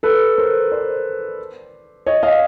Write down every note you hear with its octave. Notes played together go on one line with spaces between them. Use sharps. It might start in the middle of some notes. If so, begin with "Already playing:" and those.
A4 B4
A#4 C5
C5 D5
C#5 D#5
D#5 F5